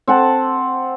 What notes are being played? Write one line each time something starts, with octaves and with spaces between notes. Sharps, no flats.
C4 F#5 A5